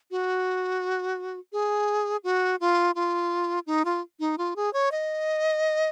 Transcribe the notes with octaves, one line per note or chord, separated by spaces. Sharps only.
F#4
G#4
F#4
F4
F4
D#4
F4
D#4
F4
G#4
C#5
D#5